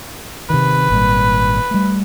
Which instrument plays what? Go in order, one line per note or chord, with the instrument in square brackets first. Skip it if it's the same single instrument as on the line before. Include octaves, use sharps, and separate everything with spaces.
[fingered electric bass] C3 D#3 [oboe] B4
[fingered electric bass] G#1 A#2 G3
G3 A3